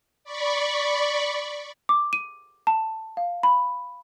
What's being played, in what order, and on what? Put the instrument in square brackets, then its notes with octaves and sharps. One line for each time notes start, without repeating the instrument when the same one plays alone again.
[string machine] D5 B5 C#6
[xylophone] D6
D#7
A5
F5
B5